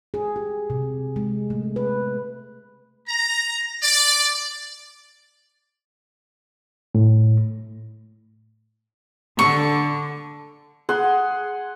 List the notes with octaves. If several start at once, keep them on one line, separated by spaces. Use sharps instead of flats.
G#4
G4
C3
G#3
A3
B4
A#5
D5
A2
D3 C#6
G#4 F#5 C6